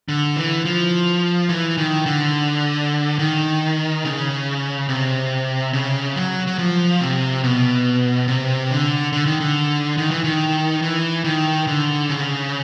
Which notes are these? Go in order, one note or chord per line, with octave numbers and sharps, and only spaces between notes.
D3
E3
F3
E3
D#3
D3
D#3
C#3
C3
C#3
F#3
F#3
F3
C3
B2
C3
D3
D3
D#3
D3
D#3
E3
D#3
E3
D#3
D3
C#3